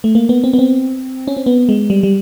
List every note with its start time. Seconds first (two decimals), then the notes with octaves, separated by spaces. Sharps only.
0.04 A3
0.15 A#3
0.29 B3
0.44 C4
0.53 B3
0.59 C4
1.28 C#4
1.37 C4
1.46 B3
1.69 G#3
1.90 G3
2.03 G3